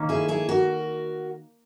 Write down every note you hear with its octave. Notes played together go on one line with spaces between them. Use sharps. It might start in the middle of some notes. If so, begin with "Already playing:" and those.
Already playing: D#3 A#3 C#4
E4 G#4
E4 G#4
F#4 A#4